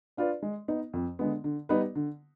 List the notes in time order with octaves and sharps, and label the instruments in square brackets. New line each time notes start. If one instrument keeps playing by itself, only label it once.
[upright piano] D4 F4 B4 D5
G#3
B3 D#4
F2
D3 G#3 B3
D3
G3 B3 D#4 B4
D3